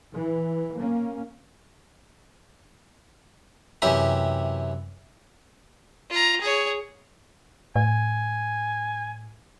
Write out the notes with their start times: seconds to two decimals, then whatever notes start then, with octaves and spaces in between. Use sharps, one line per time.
0.13 E3
0.78 A#3 C#4
3.82 F#2 C3 E3 G4 E5 D#6
6.10 F4 A#5
6.41 G#4 C#5
7.76 A2 G#5